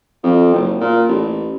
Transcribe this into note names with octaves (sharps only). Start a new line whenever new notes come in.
F2
F#1
A#2
A1